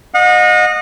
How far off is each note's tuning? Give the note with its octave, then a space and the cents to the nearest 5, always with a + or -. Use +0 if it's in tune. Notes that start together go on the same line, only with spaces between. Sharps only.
D#5 -20 F#5 -40